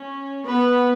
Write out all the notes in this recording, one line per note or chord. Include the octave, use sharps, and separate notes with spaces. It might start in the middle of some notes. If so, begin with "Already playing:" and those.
Already playing: C#4
B3 B4